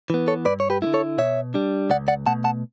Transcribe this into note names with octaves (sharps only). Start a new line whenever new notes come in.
E3 B3
A4 C#5
G2 B4 D5
C#5
G4 B4
D3 A3 E4
A4 C#5
B2 C#5 E5
G3 D4
C#2 D5 F#5
D5 F#5
B2 A3 F#5 A5
F#5 A5